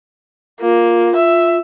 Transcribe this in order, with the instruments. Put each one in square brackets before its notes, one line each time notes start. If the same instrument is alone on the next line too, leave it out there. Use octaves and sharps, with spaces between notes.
[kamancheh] A#3 [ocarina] F4
[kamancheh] E5